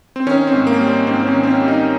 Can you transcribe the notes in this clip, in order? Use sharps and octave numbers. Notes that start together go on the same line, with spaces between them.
C4
D#3 C#4
C#4
C4
G#2
A#3
G3
C4
G#2 C4
C4
C#4
D#3
C4
C#4
G3
D#4